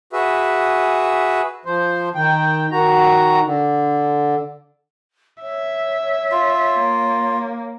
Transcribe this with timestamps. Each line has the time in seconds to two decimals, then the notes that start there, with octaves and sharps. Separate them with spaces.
0.13 F#4 G#4 B4 E5
1.65 F3 C5
2.15 D#3 G5
2.71 D#3 F#4 A#5
3.45 D3
5.42 C#5 E5
6.32 F4
6.80 A#3